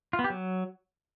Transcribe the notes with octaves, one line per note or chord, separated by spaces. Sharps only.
F4
B3
G4
F#3